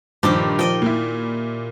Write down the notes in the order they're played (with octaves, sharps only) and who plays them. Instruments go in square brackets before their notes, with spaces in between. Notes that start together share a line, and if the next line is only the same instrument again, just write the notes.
[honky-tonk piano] G2 F3 D6 [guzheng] A#2 D#3 G4
[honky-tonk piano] F3 [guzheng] D5 D#5 G5
[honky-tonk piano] A#2 E4